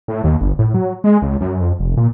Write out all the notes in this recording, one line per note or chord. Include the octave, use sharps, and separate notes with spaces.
A2
D#2
G1
A2
F#3
G#3
C#2
F#2
F2
F1
A#2